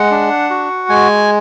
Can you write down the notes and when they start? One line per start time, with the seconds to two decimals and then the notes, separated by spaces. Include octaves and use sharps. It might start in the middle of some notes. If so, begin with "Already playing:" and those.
Already playing: G#3 F#5
0.11 D4
0.50 F#4
0.89 G#3 G#5